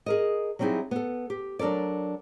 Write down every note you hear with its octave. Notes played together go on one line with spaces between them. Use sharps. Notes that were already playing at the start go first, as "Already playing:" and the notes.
G#4 A#4 D#5
F#3 G3 C4 D#4 E4 G#4
B3 A4
G4
F#3 D4 A4 A#4 D5